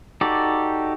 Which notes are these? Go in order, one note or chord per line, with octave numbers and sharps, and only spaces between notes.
D#4 F#4 G4 A4 D5